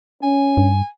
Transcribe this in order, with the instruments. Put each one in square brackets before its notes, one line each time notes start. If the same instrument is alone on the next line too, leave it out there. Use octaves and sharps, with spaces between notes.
[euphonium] C#4 [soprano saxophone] G#5
[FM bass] G2